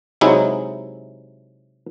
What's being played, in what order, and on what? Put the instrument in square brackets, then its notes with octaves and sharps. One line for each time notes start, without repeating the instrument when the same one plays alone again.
[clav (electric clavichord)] C3 F#3 G#3 D#4 E4